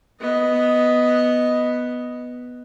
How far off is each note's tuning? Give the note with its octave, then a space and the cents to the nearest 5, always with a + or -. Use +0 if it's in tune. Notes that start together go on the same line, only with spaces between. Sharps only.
B3 +0 D#5 +0